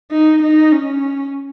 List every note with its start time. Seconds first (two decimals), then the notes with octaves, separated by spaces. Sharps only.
0.11 D#4
0.42 D#4
0.72 C#4